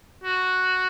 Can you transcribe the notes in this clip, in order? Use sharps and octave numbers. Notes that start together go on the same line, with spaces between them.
F#4